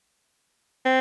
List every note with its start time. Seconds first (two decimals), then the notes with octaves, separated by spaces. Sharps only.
0.85 C4